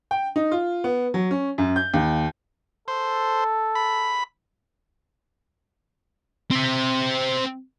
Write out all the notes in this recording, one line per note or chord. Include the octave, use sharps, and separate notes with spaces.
G5
D#4
F4
B3
F#3
C#4
F#2
G6
D#2
A4 C5
B5
C4 E5